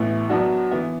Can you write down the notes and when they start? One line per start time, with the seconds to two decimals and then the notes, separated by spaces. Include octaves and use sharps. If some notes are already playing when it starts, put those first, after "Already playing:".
Already playing: A1 A2 E3 B3 E4
0.29 F#2 F#3 B3 D4 F#4
0.71 E3 B3